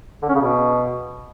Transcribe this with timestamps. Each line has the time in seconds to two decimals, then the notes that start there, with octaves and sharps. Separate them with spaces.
0.23 D3
0.29 C#4
0.35 C#3
0.41 B2